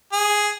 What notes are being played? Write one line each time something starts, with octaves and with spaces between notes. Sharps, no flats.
G#4